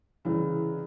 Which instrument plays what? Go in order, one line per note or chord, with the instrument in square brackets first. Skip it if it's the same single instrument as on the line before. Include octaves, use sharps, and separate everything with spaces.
[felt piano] C2 C#3 E3